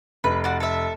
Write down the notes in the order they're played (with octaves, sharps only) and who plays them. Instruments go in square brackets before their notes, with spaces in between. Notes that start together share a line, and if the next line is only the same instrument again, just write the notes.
[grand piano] F1 [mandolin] B4
[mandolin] F#4 D5
A4 E5